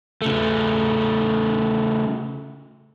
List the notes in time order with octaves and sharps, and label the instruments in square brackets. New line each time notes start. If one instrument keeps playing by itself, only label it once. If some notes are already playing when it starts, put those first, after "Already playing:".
[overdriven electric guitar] C#3 A3